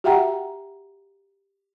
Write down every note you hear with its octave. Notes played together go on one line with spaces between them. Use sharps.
F#4 G4 E5 F#5 G5 A#5